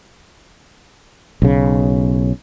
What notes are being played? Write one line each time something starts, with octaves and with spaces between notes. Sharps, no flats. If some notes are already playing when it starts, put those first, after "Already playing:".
B1 C#3